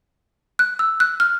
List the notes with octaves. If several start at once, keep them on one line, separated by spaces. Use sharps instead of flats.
F#6
E6
F#6
F6